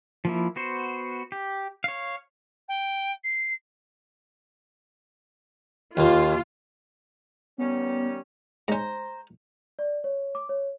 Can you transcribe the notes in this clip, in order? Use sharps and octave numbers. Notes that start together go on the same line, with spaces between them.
F3 A#3 E4
B3 F#4 C5
G4
C#5 F5
G5
C7
D#2 A#3 F4
D#3 G3 B3 C#4
G#2 C#4 C5 A#5
D5
C#5
D6
C#5